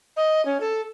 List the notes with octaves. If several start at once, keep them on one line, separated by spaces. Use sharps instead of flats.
D#5
C#4
A4